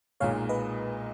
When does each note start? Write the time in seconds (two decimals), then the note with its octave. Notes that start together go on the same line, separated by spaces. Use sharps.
0.20 B1 A#2 G#3 C#5 F5
0.49 B4 D#5